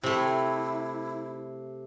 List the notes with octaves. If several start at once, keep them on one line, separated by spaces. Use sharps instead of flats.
C3 A3 E4